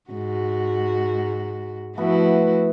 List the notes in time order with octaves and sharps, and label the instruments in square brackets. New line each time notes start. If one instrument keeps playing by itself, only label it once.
[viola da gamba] G#2 F#4
[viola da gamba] F3 E4 F#4 [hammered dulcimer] A3 B3